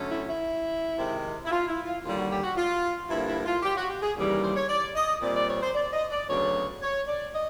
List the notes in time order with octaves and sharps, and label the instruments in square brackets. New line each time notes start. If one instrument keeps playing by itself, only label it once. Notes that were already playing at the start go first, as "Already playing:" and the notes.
Already playing: [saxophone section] D3 F#3 A3 C#4
E4
E4
C3 D#3 G#3 C4
E4
F4
E4
F4
D#2 D3 G3 F4
F#4
G4
F#4
F4
G2 D3 F3 A#3 E4
E4
F4
G4
F#4
G4
G#4
D#2 C#3 E3 G3
A#4
C5
C#5
D5
D#5
A#2 G3 C4 D5
D5
C#5
C5
D5
D#5
D5
D2 C#3 F#3 B3 C#5
C#5
D5
D#5